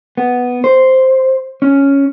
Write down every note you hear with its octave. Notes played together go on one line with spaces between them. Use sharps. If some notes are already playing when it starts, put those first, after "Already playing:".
B3
C5
C#4